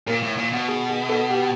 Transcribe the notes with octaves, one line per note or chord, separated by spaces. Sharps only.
A#2 A#4
A2
A#2
B2
G#4
G#4
A4
G4